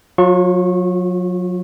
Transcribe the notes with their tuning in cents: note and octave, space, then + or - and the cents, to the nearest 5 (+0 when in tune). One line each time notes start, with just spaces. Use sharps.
F#3 -30 F4 +20 C#6 -25